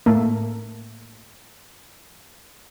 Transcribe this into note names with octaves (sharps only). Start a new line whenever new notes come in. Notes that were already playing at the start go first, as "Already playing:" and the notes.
A2 A3 A#3